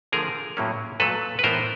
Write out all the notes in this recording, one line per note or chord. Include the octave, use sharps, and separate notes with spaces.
D3 F3 A3 G#4 A#4
A2 F#3 A#3 C#4
A#2 F#3 A3 A4 B4
B4
A2 E3 G#3 B3 A#4 C5